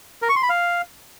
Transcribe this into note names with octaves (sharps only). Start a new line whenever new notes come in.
A#4
C#6
C6
B5
F5